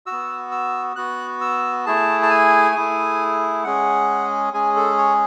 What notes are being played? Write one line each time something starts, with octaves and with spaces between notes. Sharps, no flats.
F#4 E6
B3
E6
B3 F#4 F#6
E6
A3 E4 G#4 A5
A5
G#5
A3 E4 G#4
G#3 C#4 G#4 F#5
G#3 C#4 G#4 G#5
A4
C#5